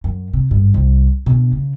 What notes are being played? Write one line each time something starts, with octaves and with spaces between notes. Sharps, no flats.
F#2
C3
G#1 G2
C2
B2 D3
C#3